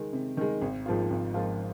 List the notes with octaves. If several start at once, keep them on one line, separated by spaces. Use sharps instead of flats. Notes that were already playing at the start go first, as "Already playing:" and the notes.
Already playing: D#3 G#3
C3
D#3 G#3
G#1
G#2 F3 A#3 F4
G#1
G#2 F3 A#3 F4